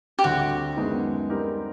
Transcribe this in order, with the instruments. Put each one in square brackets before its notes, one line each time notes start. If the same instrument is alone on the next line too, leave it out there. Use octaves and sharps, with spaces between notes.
[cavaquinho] G4
[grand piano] D2 D3 G3 C4 [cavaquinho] F#4
[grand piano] F#2 D#3 G#3 B3 D#4
G3 C4 D#4 G4 A#4